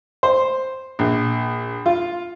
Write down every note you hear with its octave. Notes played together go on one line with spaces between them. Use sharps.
C5
A#1
F4